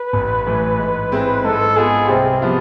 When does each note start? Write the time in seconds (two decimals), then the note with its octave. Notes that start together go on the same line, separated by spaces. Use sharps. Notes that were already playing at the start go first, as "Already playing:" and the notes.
Already playing: B4
0.13 A1
0.46 A2 E3
0.79 G#2
1.12 G#3 C4 E4 G#4
1.45 G#2 A4
1.76 G#3 B3 F4 G#4
2.10 C2 C4
2.42 C3 F3 B3 F4